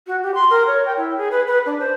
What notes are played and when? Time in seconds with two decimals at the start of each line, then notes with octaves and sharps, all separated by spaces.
0.07 F#4
0.23 G4
0.35 C6
0.50 A#4
0.67 C#5
0.85 G5
0.97 E4
1.17 G#4
1.31 B4
1.47 B4
1.66 D4
1.80 C5